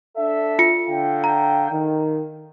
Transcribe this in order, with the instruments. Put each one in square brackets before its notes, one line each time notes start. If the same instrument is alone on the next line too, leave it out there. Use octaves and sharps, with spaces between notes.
[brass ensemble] D4 A4 E5
[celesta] F4 C#7
[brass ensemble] D3 F5 G5
[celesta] A#5
[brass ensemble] D#3